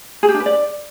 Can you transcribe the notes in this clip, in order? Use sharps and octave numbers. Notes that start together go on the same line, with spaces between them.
G#4
G4
D4
B4
D5